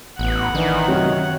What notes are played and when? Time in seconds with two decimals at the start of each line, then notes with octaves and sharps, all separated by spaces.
0.19 A1 B3 F#5
0.55 D#3 E3 D4
0.88 F#2 C3 F#3 C#5